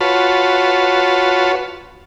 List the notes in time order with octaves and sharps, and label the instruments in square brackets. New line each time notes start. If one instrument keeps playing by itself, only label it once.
[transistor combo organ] F4 B4 A5 [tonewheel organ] F#4 C#5